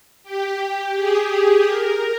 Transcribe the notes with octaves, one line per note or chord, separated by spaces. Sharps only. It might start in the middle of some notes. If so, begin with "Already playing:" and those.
G4
G#4
G#4
A#4